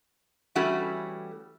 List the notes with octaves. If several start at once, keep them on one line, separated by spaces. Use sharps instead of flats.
E3 G3 A3 C#4 F#4